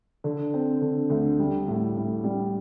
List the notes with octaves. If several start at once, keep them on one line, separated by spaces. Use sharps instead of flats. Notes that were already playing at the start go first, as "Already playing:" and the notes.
D3
C4
D3
D2
G3
A2
A2
G3